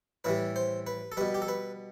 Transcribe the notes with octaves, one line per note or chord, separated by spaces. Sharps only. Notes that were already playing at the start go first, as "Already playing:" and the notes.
A2 E3 G3 B4
C5
B4
A4
B2 G3 B4
G4
A4
B4